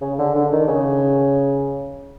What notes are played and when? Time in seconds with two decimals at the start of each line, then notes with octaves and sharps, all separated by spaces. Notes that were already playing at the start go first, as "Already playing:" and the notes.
0.01 C#3
0.18 D3
0.35 D3
0.52 D#3
0.68 C#3